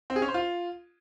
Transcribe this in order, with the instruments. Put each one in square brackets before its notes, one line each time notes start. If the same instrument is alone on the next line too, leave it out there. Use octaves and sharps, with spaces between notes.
[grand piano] C4
G#4
C#4
C5
F4